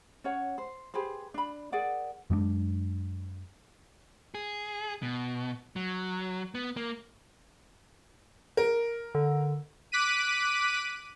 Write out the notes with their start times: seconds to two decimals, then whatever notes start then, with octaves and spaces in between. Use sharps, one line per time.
0.24 C#4 C#5 F#5
0.58 C5
0.94 G4 G#4 B4 C5
1.34 D4 B5
1.72 G#4 A#4 D5 F#5
2.30 F#2 G#3 A3 D4
4.35 G#4
5.02 B2
5.76 F#3
6.55 B3
6.77 A#3
8.57 A#4
9.15 D3
9.92 D6 F#6 B6 D#7